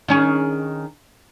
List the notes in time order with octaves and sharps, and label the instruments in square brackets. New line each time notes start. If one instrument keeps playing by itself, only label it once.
[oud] D#3 C#4 G#4